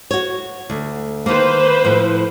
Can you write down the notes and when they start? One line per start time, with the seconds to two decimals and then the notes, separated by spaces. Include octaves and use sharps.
0.11 F#4 C#5
0.70 D2
1.26 D#3 A#3 B4 C5
1.84 A2 F3